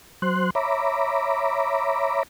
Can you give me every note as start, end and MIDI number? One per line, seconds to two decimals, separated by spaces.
0.22 0.50 54
0.22 0.50 72
0.22 0.50 84
0.22 0.50 90
0.55 2.23 73
0.55 2.23 76
0.55 2.23 82
0.55 2.23 83
0.55 2.23 86